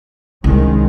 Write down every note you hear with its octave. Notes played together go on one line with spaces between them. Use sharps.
C2 D#3 G#3 C#4